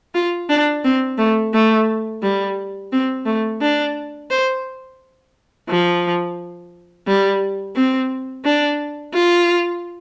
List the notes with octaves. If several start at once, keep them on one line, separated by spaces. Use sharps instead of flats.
F4
D4
C4
A3
A3
G3
C4
A3
D4
C5
F3
G3
C4
D4
F4